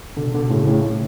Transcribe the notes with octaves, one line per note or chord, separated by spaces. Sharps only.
B2 D3
B2 D3
A2 C#3
A2 C#3